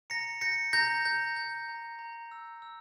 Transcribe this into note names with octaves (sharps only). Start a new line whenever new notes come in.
A#5 A#6 C#7
G6 A#6 C#7
A#5 G6 A#6
A#5 G6
G6
A#5
A#5
E6
E6